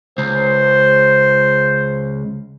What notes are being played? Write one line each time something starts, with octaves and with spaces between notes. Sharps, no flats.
C#2 C5